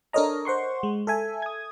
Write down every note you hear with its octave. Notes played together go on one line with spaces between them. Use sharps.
D4 A4 A#4 C#5 D#5 A#5
C5 F#5 C6 C#6
G#3
A4 E5 G#5
D#6 G#6